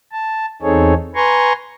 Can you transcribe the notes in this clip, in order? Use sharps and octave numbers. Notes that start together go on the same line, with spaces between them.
A5
E2 C4 D#4 G#4 A4 C#5
B4 G#5 A#5 C6 C#6